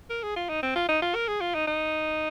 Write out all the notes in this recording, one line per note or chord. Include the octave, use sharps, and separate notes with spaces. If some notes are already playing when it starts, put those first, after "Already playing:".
A#4
G#4
F4
D#4
C4
F4
D#4
F4
A#4
G#4
F4
D#4
D#4